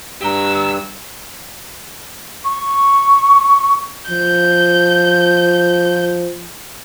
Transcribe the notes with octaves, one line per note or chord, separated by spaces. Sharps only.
G2 G4 A#5 E6
C#6
F3 G6